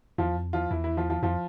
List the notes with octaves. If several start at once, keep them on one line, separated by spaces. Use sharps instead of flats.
E2 F3 F4
F2
E2 F3 F4
E2 E3 E4
E3 E4
F3 F4
F3 F4
F2 F3 F4